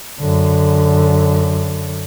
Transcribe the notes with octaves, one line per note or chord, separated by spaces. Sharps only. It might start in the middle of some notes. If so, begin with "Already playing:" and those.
F#2 D3